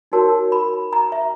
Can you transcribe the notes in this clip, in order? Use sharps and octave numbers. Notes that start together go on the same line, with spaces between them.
D#4 F#4 A#4 C#5 A5
B5
A#5
E5